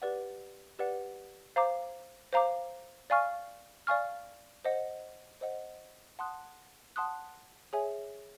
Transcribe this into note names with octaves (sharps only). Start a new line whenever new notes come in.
G4 B4 D5 F#5
G4 B4 D5 F#5
C5 F5 A#5 D6
C5 F5 A#5 D6
D5 F5 G#5 C#6 F6
D5 F5 G#5 C#6 F6
C5 D#5 F#5
C5 D#5 F#5
F#5 A5 C6 D#6 F#6
F#5 A5 C6 D#6 F#6
G#4 C#5 E5 G#5